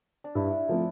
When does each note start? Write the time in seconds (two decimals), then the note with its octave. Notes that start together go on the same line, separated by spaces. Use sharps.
0.24 D4
0.35 G2 E4
0.52 D4
0.69 F3 A3 A#3 C4